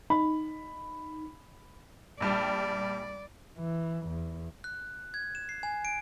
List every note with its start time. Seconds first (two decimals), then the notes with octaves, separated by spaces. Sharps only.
0.10 D#4 B5
2.20 A#1 G3 D5 A5
3.58 E3
4.07 E2
4.64 F#6
5.14 G#6
5.35 E7
5.49 C7
5.63 G#5
5.85 D7